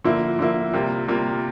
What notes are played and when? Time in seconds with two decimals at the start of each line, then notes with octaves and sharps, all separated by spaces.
0.05 D3 F3 A#3 E4
0.39 D3 F3 A#3 E4
0.74 C3 G3 A#3 F4
1.08 C3 G3 A#3 F4